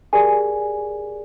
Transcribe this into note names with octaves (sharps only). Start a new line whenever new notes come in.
G4 G#4 A#4 D5 G#5